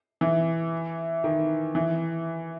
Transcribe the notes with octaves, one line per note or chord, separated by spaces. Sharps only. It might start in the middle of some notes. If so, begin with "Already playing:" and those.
E3
D#3
E3